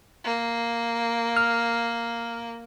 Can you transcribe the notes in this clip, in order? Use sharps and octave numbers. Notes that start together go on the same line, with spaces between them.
A#3
F6